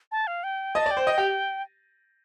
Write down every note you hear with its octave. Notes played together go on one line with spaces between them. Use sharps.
A5
F5
G5
D#5 A5
D5
G5
C5
D#5
G4